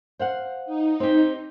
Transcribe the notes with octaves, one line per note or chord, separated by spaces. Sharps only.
C5 F5 F#5
D#4
C4 G4